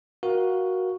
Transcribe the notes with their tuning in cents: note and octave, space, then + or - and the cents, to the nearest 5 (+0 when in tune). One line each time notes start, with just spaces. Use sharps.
F#4 +0 A#4 +20 F5 +0